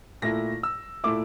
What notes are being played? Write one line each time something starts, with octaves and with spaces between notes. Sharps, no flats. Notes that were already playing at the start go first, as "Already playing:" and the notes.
A#2 A3 E4 A#6
E6
A#2 A3 E4 D6